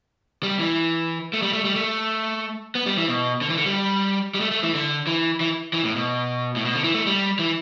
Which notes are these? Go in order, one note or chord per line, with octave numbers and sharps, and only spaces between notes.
G3
E3
A3
G3
A3
G3
A3
B3
G3
E3
B2
D3
E3
D3
G3
G3
A3
A3
E3
D3
E3
E3
E3
A2
B2
A2
B2
D3
E3
A3
G3
E3